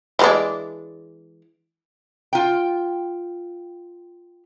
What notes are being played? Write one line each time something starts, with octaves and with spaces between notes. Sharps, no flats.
E3 G#3 D4
F4 G5